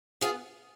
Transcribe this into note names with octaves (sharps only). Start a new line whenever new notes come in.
B3 F4 G#4